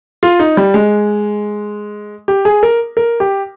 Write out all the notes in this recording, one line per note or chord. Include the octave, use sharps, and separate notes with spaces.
F4
D#4
G3
G#3
G4
G#4
A#4
A#4
G4